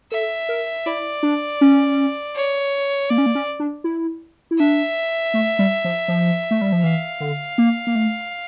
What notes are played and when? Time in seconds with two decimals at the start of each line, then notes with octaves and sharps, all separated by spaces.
0.12 A4 E5
0.49 A#4
0.86 E4 D5
1.23 D4
1.61 C#4
2.36 C#5
3.10 A#3 D5
3.18 C#4
3.26 A#3
3.35 C#4
3.60 D4
3.84 E4
4.51 E4
4.59 D4 E5
5.34 A3
5.59 G3
5.84 F3
6.08 F3
6.51 A3
6.61 G3
6.72 F3
6.83 E3 F5
7.20 D3
7.58 A#3
7.87 A#3
7.95 A3